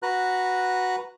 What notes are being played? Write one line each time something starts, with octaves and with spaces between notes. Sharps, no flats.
F#4 B4 A#5 F#6